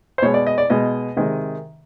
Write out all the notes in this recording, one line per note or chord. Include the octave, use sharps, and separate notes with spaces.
C5
B2 G#3 C#5
D5
D#5
D5
B2 G#3 D#5
C3 D#3 G#3